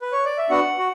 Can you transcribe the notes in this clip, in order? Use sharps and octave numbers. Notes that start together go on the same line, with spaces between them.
B4
C#5
D5
E5
B3 D4 F#4 F#5
F#4